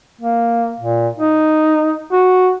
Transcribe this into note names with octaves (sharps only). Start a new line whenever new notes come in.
A#3
A#2
D#4
F#4